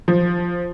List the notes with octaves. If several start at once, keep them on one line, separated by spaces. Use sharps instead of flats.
F3